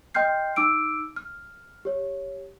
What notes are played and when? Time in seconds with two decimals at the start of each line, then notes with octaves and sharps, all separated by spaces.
0.15 D#5 G5 C6 F6 G6 C7
0.56 D#4 D6 E6 D7
1.16 F6
1.85 G4 C#5